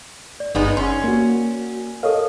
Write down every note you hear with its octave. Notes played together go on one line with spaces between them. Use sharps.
D5
G1 G#3 B3 D#4
C#4 C6
A#3 F#4
A4 A#4 C#5 D#5 F5